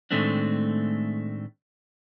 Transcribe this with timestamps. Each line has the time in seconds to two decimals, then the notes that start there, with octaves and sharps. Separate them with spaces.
0.11 A2 D#3 G#3 A3 C4 D4